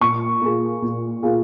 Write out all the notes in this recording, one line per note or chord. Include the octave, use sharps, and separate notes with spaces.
A#2 C#6
A#3 F4 G#4
A#2
A#3 F4 G#4